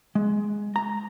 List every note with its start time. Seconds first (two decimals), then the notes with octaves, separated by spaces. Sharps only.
0.15 G#3
0.76 A#5